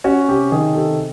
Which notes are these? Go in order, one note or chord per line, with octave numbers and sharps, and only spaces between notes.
C#4 F#4
C3 G4
D#3 G#4
C3 A4